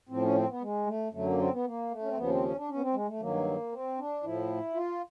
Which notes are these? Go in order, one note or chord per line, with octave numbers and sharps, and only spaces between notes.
A2 F3 C4
C#4
C4
B3
G#3
A3
F#2 D3 F#3 A3
A#3
C4
B3
A#3
A3
C#4
C4
D#2 C#3 F3 B3
C4
C#4
D4
C#4
B3
C4
G#3
A3
G2 D#3 F#3 A#3
C4
D4
A2 F3 E4
F4